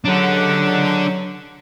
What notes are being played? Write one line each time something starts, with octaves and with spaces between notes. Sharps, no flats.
C#2 F#3 D4 G4 A4 F#5